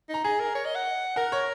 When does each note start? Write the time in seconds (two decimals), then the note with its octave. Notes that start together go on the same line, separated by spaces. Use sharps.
0.09 D#4 A#5
0.24 G#4 G#5
0.40 A#4
0.55 C#5
0.66 D#5
0.75 F#5
1.16 A#4 F#5
1.32 C#5